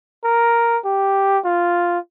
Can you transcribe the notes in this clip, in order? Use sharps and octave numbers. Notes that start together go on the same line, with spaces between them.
A#4
G4
F4